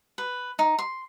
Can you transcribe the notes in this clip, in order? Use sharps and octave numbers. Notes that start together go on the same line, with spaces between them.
B4
D#4
C6